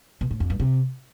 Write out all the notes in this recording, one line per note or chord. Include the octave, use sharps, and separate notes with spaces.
B2
A2
F2
G2
C3